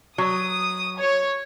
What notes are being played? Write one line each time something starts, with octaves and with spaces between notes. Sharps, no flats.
F#3 D#6
C#5